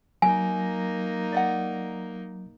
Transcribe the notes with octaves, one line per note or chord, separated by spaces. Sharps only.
F#3 A#3 D#4 G#5
D5 D#5 F#5